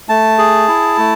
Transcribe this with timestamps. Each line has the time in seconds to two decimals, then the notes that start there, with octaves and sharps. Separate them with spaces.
0.09 A3 A5
0.38 G#4
0.68 E4
0.98 A3